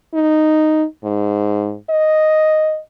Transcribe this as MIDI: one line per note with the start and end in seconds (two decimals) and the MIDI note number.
0.14 0.84 63
1.04 1.75 44
1.90 2.79 75